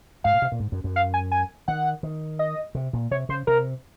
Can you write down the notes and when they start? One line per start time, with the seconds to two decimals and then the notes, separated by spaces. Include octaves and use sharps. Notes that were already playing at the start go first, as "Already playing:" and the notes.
0.24 G#2 F5
0.34 A#2
0.42 C3
0.52 A#2
0.60 G#2
0.72 F#2
0.84 F#2
0.96 F5
1.14 G#5
1.32 G#5
1.68 D#3 F#5
2.03 D#3
2.39 D#5
2.75 C3
2.93 A#2
3.11 C3 C#5
3.29 C#3 C5
3.47 C3 A#4